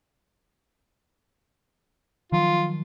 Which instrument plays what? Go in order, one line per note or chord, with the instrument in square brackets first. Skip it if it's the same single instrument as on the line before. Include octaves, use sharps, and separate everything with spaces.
[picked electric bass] D#3 F3 F#3 [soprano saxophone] F4